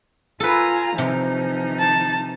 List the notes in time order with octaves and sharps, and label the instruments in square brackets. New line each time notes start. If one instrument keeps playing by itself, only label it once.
[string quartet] F4 G#5 A#5 [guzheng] A4 B4
[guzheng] C3 [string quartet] E3 F3 D#4
[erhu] A5